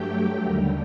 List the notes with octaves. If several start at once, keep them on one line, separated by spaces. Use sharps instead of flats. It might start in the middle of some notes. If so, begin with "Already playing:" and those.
Already playing: G2 F#3 A3 G4 G5
D#2 D3 G3 A#4 A#5